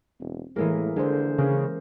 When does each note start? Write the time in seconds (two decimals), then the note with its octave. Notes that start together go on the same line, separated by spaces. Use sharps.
0.20 E1 C4
0.56 A2 E3 G#3 A#3 G#4 A#4 E5
0.96 D3 G#3 G#4 A4 C5
1.38 C#3 A#3 C#4